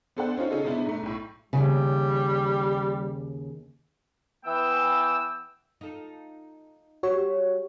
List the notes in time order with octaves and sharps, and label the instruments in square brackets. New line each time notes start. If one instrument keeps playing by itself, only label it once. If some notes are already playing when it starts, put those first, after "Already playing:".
[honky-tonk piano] B3 D4 A4 C5 D5 F#5
C4 C#4 D#4 F4
C#3 C#4 D#4 F4 A4
C3 G#3 B3 D4 E4
G#2 A3
B1 A2
[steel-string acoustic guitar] D#2 A#2 C#3 [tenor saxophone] G3
[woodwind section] E3 B3 G5 E6
[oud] D#4 F4 A4
[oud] G3 G4 C5 [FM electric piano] F#4 C#5